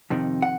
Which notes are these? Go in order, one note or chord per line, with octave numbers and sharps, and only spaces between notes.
F2 C3 D#3
F#5